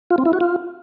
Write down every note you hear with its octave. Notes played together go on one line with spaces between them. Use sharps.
F4
C4
E4
F#4
F4